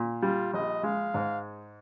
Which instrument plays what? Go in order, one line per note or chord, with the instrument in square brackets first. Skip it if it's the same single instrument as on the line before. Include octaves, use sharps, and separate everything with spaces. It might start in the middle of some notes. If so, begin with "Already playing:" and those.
Already playing: [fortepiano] A#2
[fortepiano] G3 [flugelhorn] F4
[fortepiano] A#1 [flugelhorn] D#5
[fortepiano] G#3 [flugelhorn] F5
[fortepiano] G#2